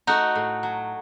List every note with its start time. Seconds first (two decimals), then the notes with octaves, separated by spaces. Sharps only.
0.07 A3 D#4 F#4
0.35 A2
0.63 F#3